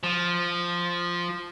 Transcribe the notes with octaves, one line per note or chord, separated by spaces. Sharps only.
F3